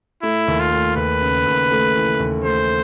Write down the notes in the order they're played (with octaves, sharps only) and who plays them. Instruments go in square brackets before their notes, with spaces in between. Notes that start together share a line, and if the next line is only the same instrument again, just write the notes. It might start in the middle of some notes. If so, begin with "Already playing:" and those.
[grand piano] A3 [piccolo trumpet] E4
[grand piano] D#2
[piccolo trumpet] F4
[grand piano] A3
[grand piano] D#2 [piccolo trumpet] B4
[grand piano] C#3
D#2
A3
E3
D#2
[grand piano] A3 [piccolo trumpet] C5